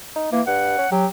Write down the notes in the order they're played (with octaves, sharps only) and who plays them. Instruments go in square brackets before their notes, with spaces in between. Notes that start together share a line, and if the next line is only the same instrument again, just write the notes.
[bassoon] D#4
[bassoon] E3 [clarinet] A#3
[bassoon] G2 [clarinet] F#5
[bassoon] C#4
[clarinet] F#3 [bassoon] G4